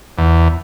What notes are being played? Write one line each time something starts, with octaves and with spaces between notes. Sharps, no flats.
E2